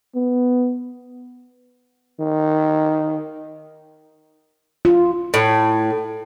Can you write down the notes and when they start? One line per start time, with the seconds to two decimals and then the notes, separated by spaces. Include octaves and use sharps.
0.16 B3
2.20 D#3
4.85 F4
5.34 A2